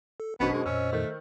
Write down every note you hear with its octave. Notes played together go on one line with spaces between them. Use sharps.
A4
A1 F#2 B2 B3 D4 C5 D#5 B6
G#3 D4
F2 A#2 C#4 E6
D#3 A3